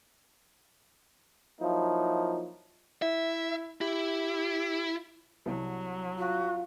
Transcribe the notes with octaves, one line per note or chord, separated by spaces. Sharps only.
F3 F#3 A#3 D#4 E4
E4 E5
E4 G4
C2 F#3
F4 F#4